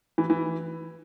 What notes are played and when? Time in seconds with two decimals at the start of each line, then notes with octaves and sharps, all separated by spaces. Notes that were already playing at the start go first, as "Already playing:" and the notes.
0.18 E3
0.30 E3